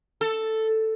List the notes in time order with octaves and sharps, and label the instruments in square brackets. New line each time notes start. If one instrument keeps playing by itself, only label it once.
[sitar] A4